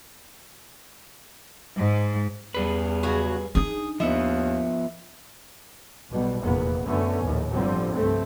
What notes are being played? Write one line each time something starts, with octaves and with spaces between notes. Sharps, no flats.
G#2
E2 G3 G#4 B4
C#3 F#3 F#4
D4 D#4 G#4
D#2 F3 B3 D#5 E5
B1 B2 G3
F1 E2 A#2 A#3 B3
F#2 D3 A3 B3 C#4
A#1 D#2 A2
G1 A2 D3 F3 G3 C4
C2 G2 A3 C4